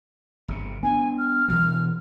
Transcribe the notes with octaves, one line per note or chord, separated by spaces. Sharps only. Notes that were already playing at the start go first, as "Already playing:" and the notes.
G1 C3
B3 D4 G#5
F6
B2 E3 F3 F6